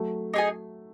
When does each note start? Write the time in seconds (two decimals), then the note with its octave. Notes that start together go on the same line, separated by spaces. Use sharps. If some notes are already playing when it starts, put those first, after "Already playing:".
Already playing: F#3 A3
0.34 D#4 G#4 D#5 G#5